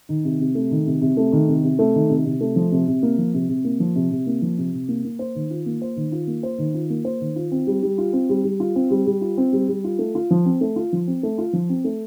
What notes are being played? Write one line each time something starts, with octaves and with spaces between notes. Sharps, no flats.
D#3
C3
C3
A3
D#3
C3
C3
A3
D#3
C3
C3
A3
D#3
C3
C3
A3
F3
C3
C3
A#3
F3
C3
C3
A#3
F3
C3
C3
A#3
F3
C3
C3
A#3
A#3
C5
D#3
F4
A#3
C5
D#3
F4
A#3
C5
D#3
F4
A#3
C5
D#3
F4
C4
G3
G3
F4
C4
G3
G3
F4
C4
G3
G3
F4
C4
G3
G3
F4
A3
F4
F3
C4
A3
F4
F3
C4
A3
F4
F3
C4
A3